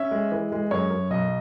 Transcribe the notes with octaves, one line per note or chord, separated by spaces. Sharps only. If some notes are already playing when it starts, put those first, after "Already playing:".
Already playing: C#4 E5
G#3
E3
G#3
F#2 C#5
F#2
B1 D#5